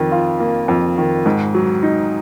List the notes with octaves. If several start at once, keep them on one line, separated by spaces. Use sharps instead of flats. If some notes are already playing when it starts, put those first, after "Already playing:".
Already playing: F2 D#3
F4
A#3
F2
D#3
G#2
F#3
D#4